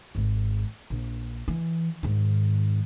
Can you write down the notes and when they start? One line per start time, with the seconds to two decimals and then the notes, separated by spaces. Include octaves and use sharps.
0.15 G#1 G#2
0.90 A#1
1.48 E3
2.03 G#2 D#3